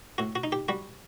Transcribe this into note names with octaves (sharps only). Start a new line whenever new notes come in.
A2 F#4
F#4
D#4
G4
G3 F#4